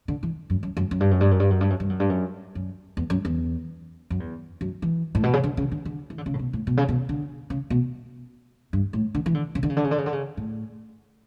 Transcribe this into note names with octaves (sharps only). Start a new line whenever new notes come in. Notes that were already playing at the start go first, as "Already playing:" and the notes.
D3
E3
F#2
F#2
F#2
F#2
G2
F#2
G2
F#2
G2
F#2
G2
F#2
G2
F#2
G2
F#2
F#2
E2
F#2
E2
F#2
E2
F#2
E3
A2
B2
C#3
D3
C#3
D3
D3
E3
D3
C#3
A2
B2
A2
B2
C#3
B2
D3
C#3
B2
G2
A2
D3
E3
D3
C#3
D3
C#3
D3
C#3
D3
C#3
D3
C#3
A2